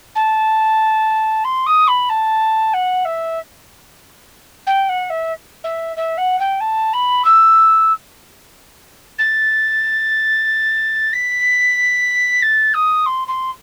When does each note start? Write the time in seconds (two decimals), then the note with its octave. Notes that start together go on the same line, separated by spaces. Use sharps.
0.15 A5
1.44 C6
1.66 D#6
1.87 B5
2.09 A5
2.73 F#5
3.05 E5
4.66 G5
4.89 F#5
5.10 E5
5.64 E5
5.97 E5
6.17 F#5
6.39 G5
6.60 A5
6.93 B5
7.24 E6
9.18 A6
11.13 B6
12.42 A6
12.74 D#6
13.06 C6
13.28 C6